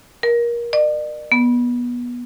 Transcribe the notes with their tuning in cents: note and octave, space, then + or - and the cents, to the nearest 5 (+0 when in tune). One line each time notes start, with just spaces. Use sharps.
A#4 +25
D5 +45
B3 -20